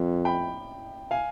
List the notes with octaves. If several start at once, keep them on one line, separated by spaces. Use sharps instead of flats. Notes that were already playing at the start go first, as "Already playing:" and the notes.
Already playing: F2
G5 B5
F5 G#5